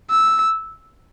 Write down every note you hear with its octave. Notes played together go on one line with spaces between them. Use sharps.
E6